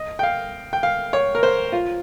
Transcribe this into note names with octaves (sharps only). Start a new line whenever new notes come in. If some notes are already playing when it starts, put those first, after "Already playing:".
Already playing: D#5
G5
F5
G5
F5
C#5
A#4
C5
F4